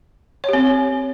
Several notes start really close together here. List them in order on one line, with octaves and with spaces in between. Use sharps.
C#5 G4 C4